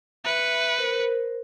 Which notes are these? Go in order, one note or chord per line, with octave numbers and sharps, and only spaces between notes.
B4 E5 C#7
A#4 C5